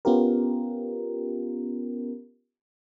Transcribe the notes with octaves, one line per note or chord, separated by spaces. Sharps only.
B3 C#4 F4 G4 A#4